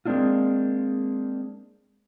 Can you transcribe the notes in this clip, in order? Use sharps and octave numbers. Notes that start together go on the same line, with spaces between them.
G#3 A#3 C4 D4 E4 F4